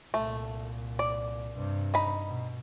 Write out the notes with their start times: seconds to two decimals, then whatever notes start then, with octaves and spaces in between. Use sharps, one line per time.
0.14 C2 A#2 A3
0.99 D5
1.55 G2 C3
1.94 D#4 B5
2.27 B2